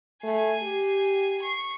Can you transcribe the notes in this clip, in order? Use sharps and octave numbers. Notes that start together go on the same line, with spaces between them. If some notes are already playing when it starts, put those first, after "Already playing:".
A3 G#5 C7
G4
C#6 C7